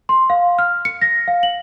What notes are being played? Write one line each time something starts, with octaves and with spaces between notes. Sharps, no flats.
C6
F5
F6
C#7
A#6
F5
F#7